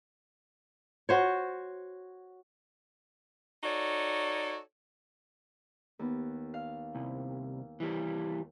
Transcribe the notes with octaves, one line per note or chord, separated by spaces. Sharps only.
F#4 C5 C#5
D#4 F#4 A4 C#5 D5
D#2 B3
F5
C2
E3 G3